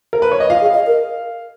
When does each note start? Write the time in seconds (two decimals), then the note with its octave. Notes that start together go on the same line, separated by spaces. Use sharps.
0.13 A#4
0.22 B4
0.32 C#5
0.40 D#5
0.49 F4 F5
0.61 G#4
0.74 D#5
0.86 A#4